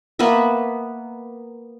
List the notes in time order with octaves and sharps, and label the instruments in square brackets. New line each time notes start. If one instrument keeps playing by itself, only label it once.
[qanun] A#3 B3 B4 E5